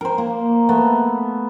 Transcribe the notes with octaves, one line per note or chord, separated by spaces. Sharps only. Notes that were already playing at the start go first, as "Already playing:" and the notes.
A#4 C5
A#3
A3 B3